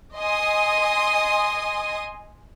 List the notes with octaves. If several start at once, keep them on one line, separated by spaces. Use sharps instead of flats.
D#5 G#5 C6 D#6